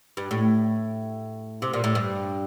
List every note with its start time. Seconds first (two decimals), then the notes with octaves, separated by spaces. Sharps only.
0.17 G2
0.31 A2
1.62 C3
1.73 A#2
1.84 A2
1.95 G2